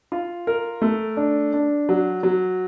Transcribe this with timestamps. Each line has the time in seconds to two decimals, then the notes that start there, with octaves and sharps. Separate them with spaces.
0.12 F4
0.47 A#4
0.82 A3
1.17 D4
1.53 D4
1.89 F#3
2.23 F#3